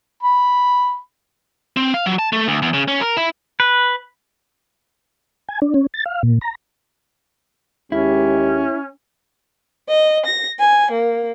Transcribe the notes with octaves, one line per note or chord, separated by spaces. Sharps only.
B5
C4
F5
F#3
A5
A3
D2
E2
C#3
C#4
A#4
E4
B4
G#5
D4
C#4
A6
F5
A#2
A#5
D#2 G#3 C#4 E4 G4
D#5
A#6
G#5
A#3